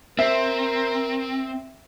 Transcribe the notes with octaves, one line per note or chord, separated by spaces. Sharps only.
C4 A#4 E5